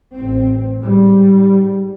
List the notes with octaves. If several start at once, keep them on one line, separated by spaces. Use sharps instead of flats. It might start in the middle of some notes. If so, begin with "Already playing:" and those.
A1 C4
G#2 G3